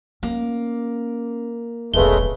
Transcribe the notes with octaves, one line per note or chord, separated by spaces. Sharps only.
A#3 C#4
E1 A#1 C#3 G#3 A3 B4 G7